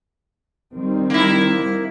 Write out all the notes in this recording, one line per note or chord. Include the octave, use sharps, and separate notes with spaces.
D#3 G3 C4
A#3 E4